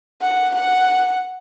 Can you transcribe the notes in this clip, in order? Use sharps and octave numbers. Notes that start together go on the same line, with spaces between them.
F#5
F#5